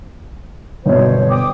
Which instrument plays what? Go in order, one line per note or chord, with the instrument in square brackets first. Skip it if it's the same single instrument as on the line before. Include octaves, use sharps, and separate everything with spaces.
[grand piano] G1 B2 [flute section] C5 C#5
[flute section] G5 D6 D#6